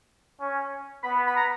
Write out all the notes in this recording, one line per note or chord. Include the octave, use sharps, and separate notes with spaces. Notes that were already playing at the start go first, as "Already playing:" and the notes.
C#4
B3 B5
B5
A#5